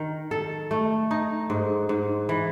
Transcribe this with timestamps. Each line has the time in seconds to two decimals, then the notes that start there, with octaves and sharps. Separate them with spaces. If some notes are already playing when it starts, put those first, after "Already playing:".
Already playing: D#3
0.31 A4
0.71 A3
1.11 D#4
1.50 G#2
1.89 G#2
2.29 E3